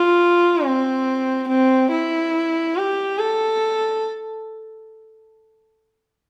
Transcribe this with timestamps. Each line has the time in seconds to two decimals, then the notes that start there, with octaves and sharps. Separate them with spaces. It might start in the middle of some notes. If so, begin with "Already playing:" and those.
Already playing: F4
0.65 C4
1.49 C4
1.91 E4
2.76 G4
3.18 A4